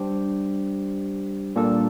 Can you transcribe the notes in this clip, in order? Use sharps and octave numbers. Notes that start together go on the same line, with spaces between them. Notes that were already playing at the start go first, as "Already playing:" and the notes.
Already playing: G3 D4 G4 C5
A#2 G3 A#3 D4 A4